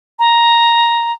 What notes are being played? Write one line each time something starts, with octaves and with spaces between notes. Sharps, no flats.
A#5